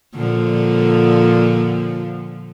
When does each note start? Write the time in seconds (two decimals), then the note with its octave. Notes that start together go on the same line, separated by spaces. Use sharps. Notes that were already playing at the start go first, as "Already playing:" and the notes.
0.14 A#2 D3 F3